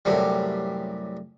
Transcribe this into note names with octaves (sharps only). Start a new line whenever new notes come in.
F#2 A2 C3 G3